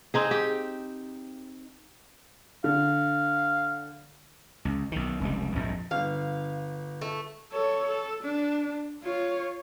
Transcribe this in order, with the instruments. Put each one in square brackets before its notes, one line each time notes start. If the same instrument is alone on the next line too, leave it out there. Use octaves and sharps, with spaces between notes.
[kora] C4 D#4 G#4
G4
[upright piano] D3 [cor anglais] F5
[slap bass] C#2
B1 D#3
F1 C#2 G3
A#1 F2 G#2
[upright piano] G1 [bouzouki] F5
[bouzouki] A3
[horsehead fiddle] A4 C#5
A4
D4
F4 C#5